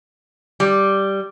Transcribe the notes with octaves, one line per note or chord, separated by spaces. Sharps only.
G3